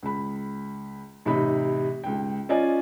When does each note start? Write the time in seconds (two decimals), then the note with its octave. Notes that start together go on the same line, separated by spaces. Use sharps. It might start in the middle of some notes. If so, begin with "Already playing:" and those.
0.03 C#2 B5
1.25 A1 C3 D#4 B5
2.04 C#2 G5
2.49 C#4 F4 D5 D#5 G#5